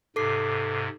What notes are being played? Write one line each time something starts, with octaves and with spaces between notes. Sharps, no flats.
G#2 C3 A4 D6 C7